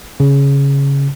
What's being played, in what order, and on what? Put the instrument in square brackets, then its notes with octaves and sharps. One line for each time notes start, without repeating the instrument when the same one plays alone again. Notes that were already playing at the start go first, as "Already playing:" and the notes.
[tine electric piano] C#3